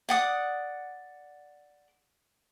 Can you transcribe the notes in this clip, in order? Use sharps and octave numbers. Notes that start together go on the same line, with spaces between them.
D5 F#5 D#6